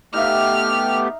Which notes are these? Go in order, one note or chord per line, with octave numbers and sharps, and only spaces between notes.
A3 B3 D#4 G4 E5 F5 F6